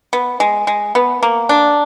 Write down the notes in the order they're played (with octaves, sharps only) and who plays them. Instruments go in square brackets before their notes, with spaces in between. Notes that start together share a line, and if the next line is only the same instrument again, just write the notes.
[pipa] B3
G#3
G#3
B3
A#3
D4